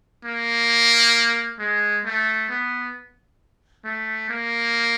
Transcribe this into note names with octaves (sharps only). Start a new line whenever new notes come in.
A#3
G#3
A3
B3
A3
A#3